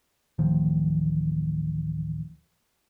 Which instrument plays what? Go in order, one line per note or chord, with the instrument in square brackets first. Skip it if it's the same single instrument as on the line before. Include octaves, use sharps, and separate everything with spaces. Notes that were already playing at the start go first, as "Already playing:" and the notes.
[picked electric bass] A1 D2 D#3 F3